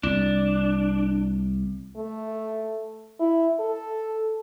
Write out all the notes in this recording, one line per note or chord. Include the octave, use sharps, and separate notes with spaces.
C2 D4
A3
E4
A4